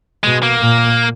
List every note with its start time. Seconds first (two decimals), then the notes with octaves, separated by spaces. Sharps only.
0.24 B2 G#3
0.43 A#3
0.60 A#2